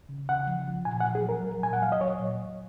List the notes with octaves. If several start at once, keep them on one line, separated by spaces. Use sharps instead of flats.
C#3
C#3 F#5
F3
F3
A#2 G#5
F#5
A#2
G#4
F#3 A#4
F#3
A#2 G#5
F#5
F#3 F5
D#5
F#3 C#5
A#2